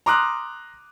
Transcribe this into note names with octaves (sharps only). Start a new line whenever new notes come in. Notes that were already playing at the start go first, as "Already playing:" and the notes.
A#5 C6 D6 D#6 F6 F#6